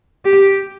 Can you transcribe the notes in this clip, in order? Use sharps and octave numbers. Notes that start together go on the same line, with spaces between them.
G4